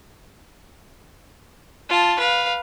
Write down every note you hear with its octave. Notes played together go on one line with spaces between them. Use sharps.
F4 A5
B4 F5